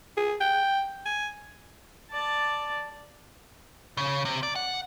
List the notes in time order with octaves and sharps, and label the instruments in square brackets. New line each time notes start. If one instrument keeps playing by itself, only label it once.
[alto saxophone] G#4
G5
G#5
[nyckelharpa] D5 A5
[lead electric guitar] C#3
C3
D5
F#5